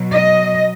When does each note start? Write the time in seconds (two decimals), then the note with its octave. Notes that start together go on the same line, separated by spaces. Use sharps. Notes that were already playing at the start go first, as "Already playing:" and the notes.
Already playing: B2 F#3
0.11 D#5